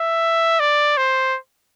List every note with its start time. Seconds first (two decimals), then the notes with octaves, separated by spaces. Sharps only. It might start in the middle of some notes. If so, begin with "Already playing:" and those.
Already playing: E5
0.60 D5
0.98 C5